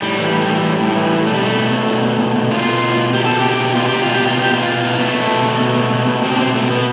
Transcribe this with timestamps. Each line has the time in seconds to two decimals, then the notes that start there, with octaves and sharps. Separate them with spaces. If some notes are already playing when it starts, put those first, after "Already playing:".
0.02 A2 G3
0.18 E3
0.33 A2
0.49 E3
0.64 A2
0.80 A2
0.96 E3
1.11 A2
1.27 B2 A3
1.35 G3
1.42 B2 A3
1.58 B2
1.73 B2
1.89 B2
2.05 B2
2.20 B2
2.36 B2
2.51 B2 F4
2.66 B2
2.82 B2
2.97 B2
3.13 B2 G4
3.25 B2 A4
3.38 G4
3.44 B2
3.60 B2
3.75 B2 F4
3.88 B2 G4
4.01 B2 F4
4.14 G4
4.22 B2
4.28 F4
4.37 B2 G4
4.52 B2 F4
4.68 B2
4.84 B2
4.99 B2 A3
5.15 B2
5.30 B2
5.46 B2
5.62 B2
5.77 B2
5.92 B2
6.08 B2
6.23 B2 C4
6.34 D4
6.39 B2 C4
6.55 B2 A3
6.66 C4
6.70 B2 B3